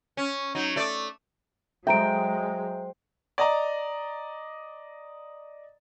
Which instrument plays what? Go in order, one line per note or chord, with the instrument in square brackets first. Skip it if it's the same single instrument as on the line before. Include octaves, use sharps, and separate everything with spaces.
[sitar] C#4
F#3 D#4
A3 D5
[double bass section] F#3 G#3 [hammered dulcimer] C5 G5 [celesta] E5 A#5 D7
[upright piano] D5 D#5 A#5